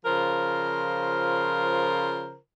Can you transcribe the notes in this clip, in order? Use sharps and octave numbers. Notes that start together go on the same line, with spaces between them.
C#3 F3 F4 A#4 C5